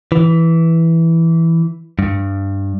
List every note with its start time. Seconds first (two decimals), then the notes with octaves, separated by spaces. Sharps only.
0.12 E3
1.99 G2